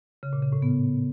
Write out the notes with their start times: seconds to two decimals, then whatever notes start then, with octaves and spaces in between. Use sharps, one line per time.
0.23 C#3
0.33 A#2
0.43 C#3
0.53 A2
0.62 B3